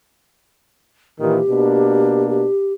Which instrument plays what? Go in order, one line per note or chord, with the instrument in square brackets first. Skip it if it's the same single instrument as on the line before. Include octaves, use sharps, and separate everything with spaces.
[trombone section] A#2 D#3 E3 [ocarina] G4
[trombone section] B2 A#3 D4
[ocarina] G4